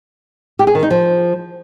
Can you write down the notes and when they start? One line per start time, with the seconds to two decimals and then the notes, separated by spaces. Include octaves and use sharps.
0.59 G4
0.67 G#4
0.75 D#3
0.83 D#4
0.91 F3